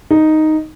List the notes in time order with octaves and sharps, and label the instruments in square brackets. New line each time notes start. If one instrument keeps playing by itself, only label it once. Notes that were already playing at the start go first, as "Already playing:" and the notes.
[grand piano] D#4